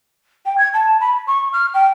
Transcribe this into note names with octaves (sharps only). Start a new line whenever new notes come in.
G5
G#6
A5
B5
C#6
F6
G5